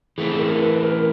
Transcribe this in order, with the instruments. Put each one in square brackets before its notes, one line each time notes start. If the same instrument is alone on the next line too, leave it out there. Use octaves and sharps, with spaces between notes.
[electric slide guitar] E3 A3 C4 [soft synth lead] G#4
[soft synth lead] A#4
B4
B4
A#4